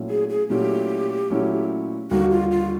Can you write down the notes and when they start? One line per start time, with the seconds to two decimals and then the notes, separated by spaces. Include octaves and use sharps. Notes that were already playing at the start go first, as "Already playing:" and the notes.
Already playing: A#2 F#3 A3 C#4 E4
0.10 G#4
0.29 G#4
0.50 A#2 F#3 A3 C#4 E4 G4
1.30 A#2 F#3 A3 C#4 E4
2.11 D#2 D3 G3 A#3 D#4 F#4
2.31 F4
2.51 F4